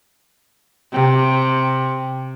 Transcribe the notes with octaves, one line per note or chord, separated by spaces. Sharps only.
C3